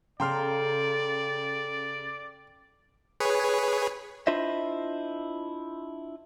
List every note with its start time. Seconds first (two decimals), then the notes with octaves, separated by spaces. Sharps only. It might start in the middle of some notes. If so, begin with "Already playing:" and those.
0.20 C#3 A4 D5 F5 G5 A#5 C6 F6
3.20 G#4 B4 C#5
4.27 D4 E4 F4 C5 D#5 E5